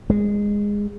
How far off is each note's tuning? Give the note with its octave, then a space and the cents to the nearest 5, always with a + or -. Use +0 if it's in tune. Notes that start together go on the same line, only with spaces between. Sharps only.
G#3 -15